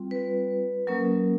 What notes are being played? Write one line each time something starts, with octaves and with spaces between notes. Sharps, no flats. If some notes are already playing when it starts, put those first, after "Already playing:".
Already playing: G3 C4 F4
B4
F#3 A#3 C#4 A#4